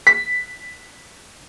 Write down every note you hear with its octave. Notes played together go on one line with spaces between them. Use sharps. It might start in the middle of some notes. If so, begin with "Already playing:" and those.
B6